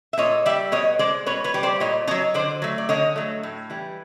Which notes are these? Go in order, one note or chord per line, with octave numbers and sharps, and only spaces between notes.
E5
A#2 C#5 D#5
G3 D5 E5
B2 C#5 D#5
G#3 C5 D5
B2 B4 C#5
B4 C#5
G3
C5 D5
A#2 C#5 D#5
A3 C#5 D#5
F#3
D3 C5 D5
F#3 A3
D5
D3 C#5 D#5
F#3 A3
A2
E3 G3